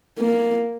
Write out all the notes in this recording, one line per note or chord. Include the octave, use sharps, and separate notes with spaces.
A#3